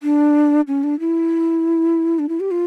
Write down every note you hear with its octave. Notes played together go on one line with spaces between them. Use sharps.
D4
C#4
D4
E4
D4
E4
G4
F4